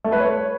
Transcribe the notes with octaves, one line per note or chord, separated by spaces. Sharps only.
A3
B4
C#5